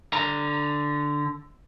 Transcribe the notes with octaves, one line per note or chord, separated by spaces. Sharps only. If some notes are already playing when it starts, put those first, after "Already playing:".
D3 A#5